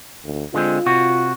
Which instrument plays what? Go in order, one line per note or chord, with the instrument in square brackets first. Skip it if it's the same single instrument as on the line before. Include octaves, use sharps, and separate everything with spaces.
[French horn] D2
[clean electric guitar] D3 G#3 C4 [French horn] F4
[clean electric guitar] C3 F#4